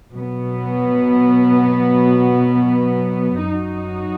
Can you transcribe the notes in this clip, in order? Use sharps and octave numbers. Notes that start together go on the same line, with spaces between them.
B2 F#3 B3
F#2 F#3 D#4 F#4